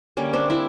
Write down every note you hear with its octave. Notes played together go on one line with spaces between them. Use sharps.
D3 G3 A#3 C#4
C4 D4
D4 E4